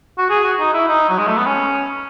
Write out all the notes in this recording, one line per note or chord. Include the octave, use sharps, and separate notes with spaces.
F#4
G#4
F#4
D#4
E4
D#4
F#3
G#3
A3
B3
C#4